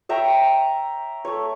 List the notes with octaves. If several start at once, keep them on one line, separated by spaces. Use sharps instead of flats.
C#5 E5 G5 A#5
A3 C#5